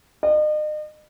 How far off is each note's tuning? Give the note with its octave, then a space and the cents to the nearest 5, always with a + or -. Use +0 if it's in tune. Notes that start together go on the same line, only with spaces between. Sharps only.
D#5 -40